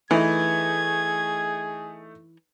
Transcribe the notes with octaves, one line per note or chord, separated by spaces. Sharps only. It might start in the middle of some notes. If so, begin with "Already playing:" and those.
E3 A3 D#4 G#4 G#6